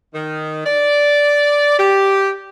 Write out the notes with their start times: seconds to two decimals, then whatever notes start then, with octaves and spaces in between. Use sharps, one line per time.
0.15 D#3
0.66 D5
1.79 G4